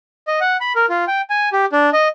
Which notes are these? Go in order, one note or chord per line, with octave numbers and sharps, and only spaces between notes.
D#5
F#5
B5
A#4
F4
G5
G#5
G4
D4
D#5